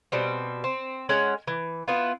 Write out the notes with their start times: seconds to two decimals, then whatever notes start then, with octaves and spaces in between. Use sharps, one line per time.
0.12 B2 G3 C4
0.64 C4
1.09 G#3 C#4 F#5
1.47 E3
1.88 B3 E4 F4